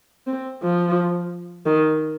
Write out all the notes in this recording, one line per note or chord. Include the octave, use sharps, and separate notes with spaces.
C4
F3
D#3